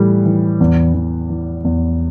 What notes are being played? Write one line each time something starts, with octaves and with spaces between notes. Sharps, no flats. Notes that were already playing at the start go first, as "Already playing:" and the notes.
Already playing: A2 E3 G3
E3
E2
E2
E3
E2